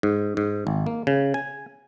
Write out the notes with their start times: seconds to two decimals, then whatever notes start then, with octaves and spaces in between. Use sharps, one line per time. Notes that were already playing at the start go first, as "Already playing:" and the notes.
0.03 G#2
0.37 G#2
0.67 G#1
0.86 A#3
1.07 C#3
1.34 G#5